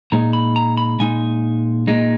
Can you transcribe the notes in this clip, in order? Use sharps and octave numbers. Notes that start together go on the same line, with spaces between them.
A#2 G#3 D#4 A#5
B5
A#5
B5
A#2 G#3 D#4 G#5
A#2 G#3 D#4